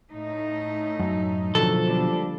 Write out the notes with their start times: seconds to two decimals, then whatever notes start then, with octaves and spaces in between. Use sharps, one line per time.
0.12 A2 A3 D#4
0.99 F#2
1.55 B2 D3 F3 F#3 A4
1.84 G3 A#3 D4